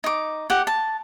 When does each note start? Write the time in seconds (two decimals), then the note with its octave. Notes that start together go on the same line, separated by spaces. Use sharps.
0.04 D#4 D6
0.50 G4 F#5
0.67 A5